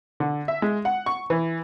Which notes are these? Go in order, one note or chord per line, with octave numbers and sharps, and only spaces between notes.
D3
E5
G#3
F#5
C#6
E3